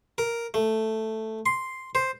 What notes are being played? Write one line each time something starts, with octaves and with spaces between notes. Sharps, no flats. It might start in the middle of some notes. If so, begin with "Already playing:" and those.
A#4
A3
C6
C5